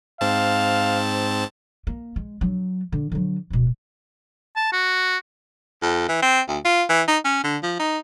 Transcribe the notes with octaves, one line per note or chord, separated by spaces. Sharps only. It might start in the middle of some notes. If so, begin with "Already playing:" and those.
G#2 C4 F5 A5
A#3
G#3
F#3 D4
D3
D3 F#3
D1 B2
A5
F#4
F2
E3
C4
D2
F4
E3
D#4
C#4
D3
F3
D#4